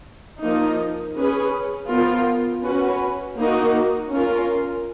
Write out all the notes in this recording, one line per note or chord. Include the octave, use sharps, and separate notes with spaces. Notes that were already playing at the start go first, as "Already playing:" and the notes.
F3 A#3 D#4
C#4 G#4 B4
F3 B3 F4 A#4
C#4 F#4 B4
A#3 D#4 F#4
C#4 F4 A#4